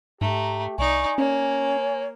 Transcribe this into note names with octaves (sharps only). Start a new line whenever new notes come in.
G#2 A3 G4 A#5
C2 D#4 D5 G#5 C#6
A#3 C#4 C#5